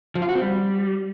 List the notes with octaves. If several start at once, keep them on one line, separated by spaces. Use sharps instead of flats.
F3
F4
F#4
C4
G3